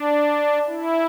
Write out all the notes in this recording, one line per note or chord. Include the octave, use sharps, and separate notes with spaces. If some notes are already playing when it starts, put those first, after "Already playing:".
Already playing: D4
E4